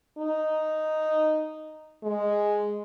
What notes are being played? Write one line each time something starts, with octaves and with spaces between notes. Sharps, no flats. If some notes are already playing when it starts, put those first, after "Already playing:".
D#4
G#3